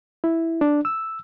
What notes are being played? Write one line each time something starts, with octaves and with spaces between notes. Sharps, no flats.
E4
D4
E6